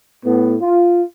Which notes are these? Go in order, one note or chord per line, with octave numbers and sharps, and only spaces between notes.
A2 B3
F4